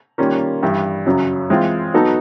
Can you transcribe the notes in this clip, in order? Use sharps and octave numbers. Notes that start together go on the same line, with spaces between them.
D#3 G3 A#3 C#4 F4
G2 E3 G3
F#2 C#3 F#3
E3 G#3 C4 F4
F#3 B3 D#4 F#4 A4